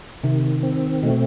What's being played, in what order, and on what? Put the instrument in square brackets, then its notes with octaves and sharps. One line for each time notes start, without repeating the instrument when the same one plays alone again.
[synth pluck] C3 [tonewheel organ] D#3
[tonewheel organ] C4
[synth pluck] B2 [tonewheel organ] A3